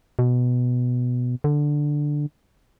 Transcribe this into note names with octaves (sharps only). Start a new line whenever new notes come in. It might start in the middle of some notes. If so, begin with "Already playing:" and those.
B2
D3